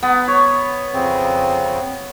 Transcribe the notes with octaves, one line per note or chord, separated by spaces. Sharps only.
B3
C#5
F2 C#3 C4